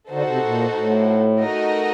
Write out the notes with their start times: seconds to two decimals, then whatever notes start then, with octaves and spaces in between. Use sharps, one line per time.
0.11 D3 D#4 F#4 A4 C5
0.27 C3
0.44 A#2
0.76 A2
1.39 A3 D#4 F#4 A#4 D#5